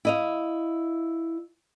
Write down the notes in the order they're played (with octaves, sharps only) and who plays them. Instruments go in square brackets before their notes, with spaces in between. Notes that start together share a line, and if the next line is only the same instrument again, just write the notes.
[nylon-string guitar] E4 D#5 F5